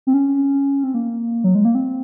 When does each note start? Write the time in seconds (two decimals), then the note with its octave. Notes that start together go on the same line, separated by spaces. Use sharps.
0.07 C4
0.14 C#4
0.84 C4
0.94 A#3
1.44 F#3
1.55 G#3
1.65 A#3
1.75 C4